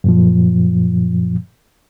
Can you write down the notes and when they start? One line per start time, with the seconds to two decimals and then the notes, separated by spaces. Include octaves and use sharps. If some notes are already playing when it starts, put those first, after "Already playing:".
0.04 F#2 A#2 F3